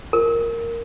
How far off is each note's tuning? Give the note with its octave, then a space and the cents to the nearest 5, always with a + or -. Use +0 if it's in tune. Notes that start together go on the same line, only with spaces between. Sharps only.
A#4 -5